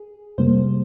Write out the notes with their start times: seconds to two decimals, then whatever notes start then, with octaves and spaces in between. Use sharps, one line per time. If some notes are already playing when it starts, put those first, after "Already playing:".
Already playing: G#4
0.38 F2 C3 G3 A#3 C5